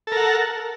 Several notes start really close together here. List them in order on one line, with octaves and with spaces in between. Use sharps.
A4 A#4 F#5